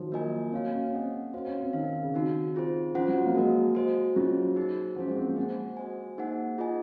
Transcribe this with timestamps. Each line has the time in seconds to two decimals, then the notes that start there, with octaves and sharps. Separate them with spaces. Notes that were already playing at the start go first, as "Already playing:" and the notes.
Already playing: D#3 F3 F#3
0.12 A#3 F4 A#4 D#5 G#5
0.52 A#3 F#4 C#5 F5 G#5
0.72 C#4
0.87 C#4
0.93 C4 G#4 D#5 F#5
1.33 C#4 F#4 C5 F5
1.47 C#4
1.60 C4
1.73 D#3 D#4 A#4 F5
2.03 C#3
2.14 D#3 C4 D#4 F#4
2.54 C4 F4 G#4 C5
2.95 F3 C#4 F4 C5 F#5
3.08 F#3
3.26 A#3
3.35 G#3 F#4 A#4 D#5
3.75 F#4 C5 D#5
4.16 F#3 C#4 F4 G#4 C5
4.56 D#4 G#4 C5
4.96 F3 C#4 G#4 C5 F#5
5.07 G#3
5.17 C4
5.27 A#3
5.36 G#3 G#4 C5 F#5
5.77 F#4 C5 D#5 G#5
6.18 A#3 D#4 G#4 C5 F#5
6.58 F4 G#4 D#5 G#5